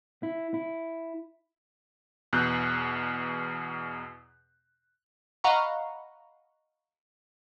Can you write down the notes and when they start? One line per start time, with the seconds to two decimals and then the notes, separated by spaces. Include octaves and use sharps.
0.23 E4
0.54 E4
2.33 E2 B2 F#6 G6
5.44 D#5 F5 F#5 A#5 B5 C#6